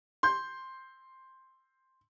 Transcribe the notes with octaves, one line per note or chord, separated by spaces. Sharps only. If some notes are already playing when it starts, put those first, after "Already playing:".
C6 G6